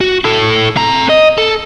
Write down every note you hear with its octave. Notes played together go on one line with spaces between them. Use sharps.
F#4
E4 A4
C4 A#5
D#5
A4